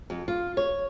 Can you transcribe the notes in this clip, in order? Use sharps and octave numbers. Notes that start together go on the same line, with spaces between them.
F2
F4
C#5